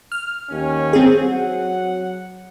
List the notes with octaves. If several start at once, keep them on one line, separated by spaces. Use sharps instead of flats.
F6
D#2 C#4
C4 G#4
F#3 F#5